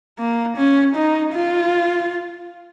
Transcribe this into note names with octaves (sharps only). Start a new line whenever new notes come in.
A#3
C#4
D#4
F4